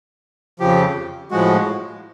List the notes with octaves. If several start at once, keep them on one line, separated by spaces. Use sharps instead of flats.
F2 C#3 F3 G4
A2 F3 G#3 F#4